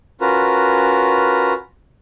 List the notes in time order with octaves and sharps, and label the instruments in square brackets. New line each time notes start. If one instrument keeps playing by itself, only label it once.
[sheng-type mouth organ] C#4 F4 F#4 A#4 B4